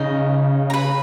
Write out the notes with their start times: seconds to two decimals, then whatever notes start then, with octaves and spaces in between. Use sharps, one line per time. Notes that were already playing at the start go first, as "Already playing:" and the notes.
Already playing: C#3 D#4 D#5
0.70 A#5
0.73 B4 B5